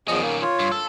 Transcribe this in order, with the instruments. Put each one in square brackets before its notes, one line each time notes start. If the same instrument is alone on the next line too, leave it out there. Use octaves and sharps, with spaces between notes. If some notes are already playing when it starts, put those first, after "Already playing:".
[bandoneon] E2 F3 D#5 [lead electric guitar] D#3 C#4
[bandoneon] A#3
F4 C#5
[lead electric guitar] G2
A4